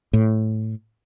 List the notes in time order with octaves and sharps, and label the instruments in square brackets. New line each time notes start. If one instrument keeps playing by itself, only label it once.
[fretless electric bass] A2